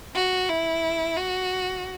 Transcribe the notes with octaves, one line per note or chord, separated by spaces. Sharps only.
F#4
E4
F#4